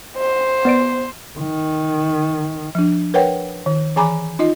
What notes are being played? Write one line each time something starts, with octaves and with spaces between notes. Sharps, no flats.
C5
B3 D5 D7
D#3
F3 D4
A#4 B4 C#5 F#5 G5
D#3
E3 G#4 G#5 A#5 B5 D6
D#4 F4 D#5